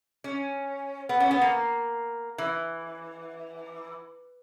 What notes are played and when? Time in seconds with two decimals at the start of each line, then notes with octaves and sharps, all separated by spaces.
0.24 C#4
1.09 B3
1.20 C#4
1.31 B3
1.42 A#3
2.38 E3